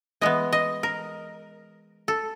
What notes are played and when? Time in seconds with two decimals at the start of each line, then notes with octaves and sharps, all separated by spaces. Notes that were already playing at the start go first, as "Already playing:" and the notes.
0.21 E3 G#3 B3 D#5
0.53 D#5
0.83 A#4
2.08 A4